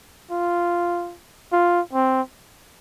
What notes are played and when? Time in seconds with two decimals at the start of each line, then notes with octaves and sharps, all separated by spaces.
0.31 F4
1.52 F4
1.93 C4